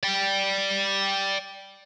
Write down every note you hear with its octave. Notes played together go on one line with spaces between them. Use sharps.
D5 G5